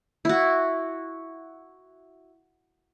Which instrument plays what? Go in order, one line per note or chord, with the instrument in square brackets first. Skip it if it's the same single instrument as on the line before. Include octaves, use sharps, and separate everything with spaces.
[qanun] E4 F#4